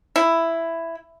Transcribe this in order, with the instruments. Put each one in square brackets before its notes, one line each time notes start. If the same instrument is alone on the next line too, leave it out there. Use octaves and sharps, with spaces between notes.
[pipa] E4